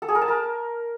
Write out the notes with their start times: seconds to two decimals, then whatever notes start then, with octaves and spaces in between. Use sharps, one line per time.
0.02 A4
0.08 G#4
0.15 A#4
0.21 A5
0.28 A#4